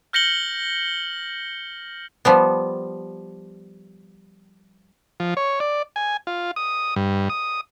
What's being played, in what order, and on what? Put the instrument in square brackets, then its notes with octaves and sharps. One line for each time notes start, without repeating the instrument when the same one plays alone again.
[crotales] F6 G6 A#6 C#7 F#7 G7
[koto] F3 G3 B3
[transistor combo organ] F3
C#5
D5
G#5
F4
D#6
G2
D#6